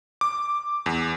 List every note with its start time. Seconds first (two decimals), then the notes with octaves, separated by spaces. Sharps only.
0.21 D6
0.86 E2